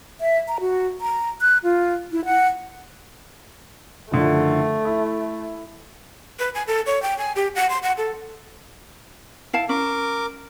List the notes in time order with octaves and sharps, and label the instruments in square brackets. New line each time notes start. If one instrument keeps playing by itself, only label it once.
[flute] E5
A#5
F#4
A#5
F#6
F4
E4
F#5
[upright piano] F#1 D3 F3 [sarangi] A3
[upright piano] E4
[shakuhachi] B4
G#5
A4
C#5
G5
G#5
G4
F#5
C6
F#5
A4
[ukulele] E4 F5 A5
[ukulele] C#4 [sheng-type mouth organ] A#4 D6